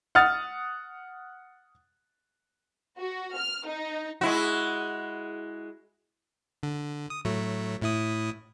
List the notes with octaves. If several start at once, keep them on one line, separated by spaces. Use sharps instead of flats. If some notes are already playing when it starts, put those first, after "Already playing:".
F#5 D#6 F6 A6
F#4
F6
D#4
G#3 E4 F#4
D3
D#6
A2 F#3 A3
A2 E4 D#6